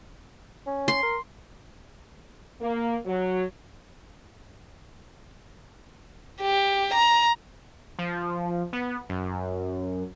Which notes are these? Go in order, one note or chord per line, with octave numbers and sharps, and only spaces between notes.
C#4
C6
A#4
A#3
F#3
G4
A#5
F3
B3
F#2